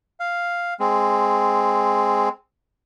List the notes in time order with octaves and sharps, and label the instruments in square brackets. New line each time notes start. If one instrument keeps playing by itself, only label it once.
[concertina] F5
G#3 C4